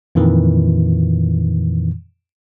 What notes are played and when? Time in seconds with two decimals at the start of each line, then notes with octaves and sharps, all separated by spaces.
0.15 F2 A#2 D#3 E3